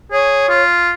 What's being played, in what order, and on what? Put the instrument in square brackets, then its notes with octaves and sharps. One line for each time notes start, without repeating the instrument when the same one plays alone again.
[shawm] G#4 [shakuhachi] C#5
[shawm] F4